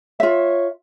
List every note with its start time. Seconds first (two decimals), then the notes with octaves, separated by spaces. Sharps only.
0.20 F4 C#5 E5